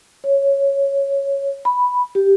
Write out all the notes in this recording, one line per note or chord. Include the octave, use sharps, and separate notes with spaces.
C#5
B5
G4